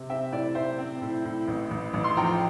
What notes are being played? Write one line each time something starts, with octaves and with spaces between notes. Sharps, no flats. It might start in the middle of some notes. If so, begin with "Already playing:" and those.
Already playing: C3
C4 E5 G5
A2 D5
A2 C5 E5
C4
A2
A2
A1
A1
A1
C6
F3 G5 A#5